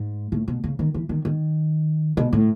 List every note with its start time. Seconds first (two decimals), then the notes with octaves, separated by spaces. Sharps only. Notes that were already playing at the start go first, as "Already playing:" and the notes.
Already playing: G#2
0.32 A2
0.48 B2
0.64 C#3
0.79 D#3
0.94 E3
1.09 D#3
1.25 D#3
2.17 B2
2.33 A2